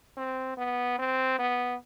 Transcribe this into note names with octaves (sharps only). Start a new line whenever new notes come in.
C4
B3
C4
B3